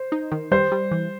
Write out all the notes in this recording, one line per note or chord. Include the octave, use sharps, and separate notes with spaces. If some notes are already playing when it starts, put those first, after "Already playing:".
Already playing: C5
D#4
D#3
G3 C5
G3
E3